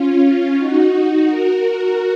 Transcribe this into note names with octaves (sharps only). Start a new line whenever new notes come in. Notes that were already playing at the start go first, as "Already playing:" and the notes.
Already playing: C#4 F4
D#4 F#4
F#4 A#4